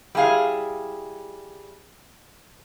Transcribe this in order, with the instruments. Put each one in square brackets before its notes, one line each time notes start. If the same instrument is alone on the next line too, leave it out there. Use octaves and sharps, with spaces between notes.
[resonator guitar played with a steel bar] G3 E4 G#4 F5